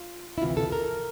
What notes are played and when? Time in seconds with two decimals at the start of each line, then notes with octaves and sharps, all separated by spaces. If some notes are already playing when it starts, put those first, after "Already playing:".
Already playing: F4
0.38 E4
0.41 D2 C3 E3 F4
0.57 A4
0.72 A#4